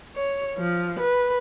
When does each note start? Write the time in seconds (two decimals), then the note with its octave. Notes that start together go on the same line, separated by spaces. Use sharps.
0.15 C#5
0.58 F3
0.99 B4